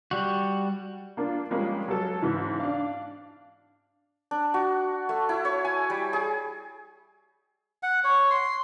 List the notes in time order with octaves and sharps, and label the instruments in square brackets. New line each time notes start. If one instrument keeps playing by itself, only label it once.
[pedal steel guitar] G3 F#4
[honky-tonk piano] A#3 D4 F4
F3 G3 G#3 A#3 C#4
F#3 A4
G#2 C#3 E3
D4 F5
[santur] D4
F#4
A3
E4
C#5
G#5
G3
G#4
[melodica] F#5
C#5
C6